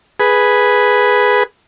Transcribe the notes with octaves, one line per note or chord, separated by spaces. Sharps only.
G#4 B4